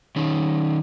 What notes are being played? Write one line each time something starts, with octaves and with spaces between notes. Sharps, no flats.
D#3 C#4